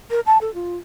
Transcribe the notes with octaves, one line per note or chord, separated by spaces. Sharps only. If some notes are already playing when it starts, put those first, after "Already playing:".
A#4
A5
A4
F4